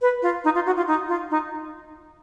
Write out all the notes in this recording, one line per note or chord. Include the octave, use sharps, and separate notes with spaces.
B4
F4
D#4
F4
F#4
F4
D#4
F4
D#4